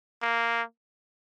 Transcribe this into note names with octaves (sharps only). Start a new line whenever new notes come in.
A#3